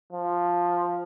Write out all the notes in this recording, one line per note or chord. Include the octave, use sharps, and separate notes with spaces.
F3